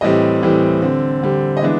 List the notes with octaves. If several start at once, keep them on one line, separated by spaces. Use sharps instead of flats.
A2 E3 G3 C4 D#5
A2 E3 G3 C4
D3 G3 C4
D3 G3 C4
D#5
E3 G#3 B3 D4 E5